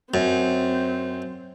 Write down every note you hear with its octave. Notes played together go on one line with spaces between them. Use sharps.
F#2 C4